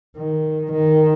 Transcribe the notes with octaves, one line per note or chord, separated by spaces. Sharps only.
D#3
D#3